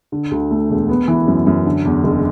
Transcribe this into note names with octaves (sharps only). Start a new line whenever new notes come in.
D3
D2
A3
E1
B3
E3
F#2
F#2
D3
E2
F#1